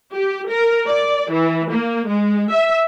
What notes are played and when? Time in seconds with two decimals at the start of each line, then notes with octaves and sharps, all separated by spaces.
0.14 G4
0.50 A#4
0.88 D5
1.32 E3
1.71 A#3
2.08 G#3
2.51 E5